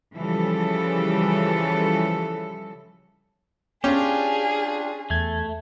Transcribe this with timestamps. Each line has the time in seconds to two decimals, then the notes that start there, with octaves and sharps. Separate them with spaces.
0.16 C#3 E3 F3 G3 A4
3.84 C#4 D4 F4 G4 G#4
5.10 E2 A3 G#6